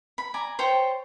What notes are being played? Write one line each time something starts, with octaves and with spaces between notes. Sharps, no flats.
B5
D5 G#5 A#5
C5 C#5 G5 A5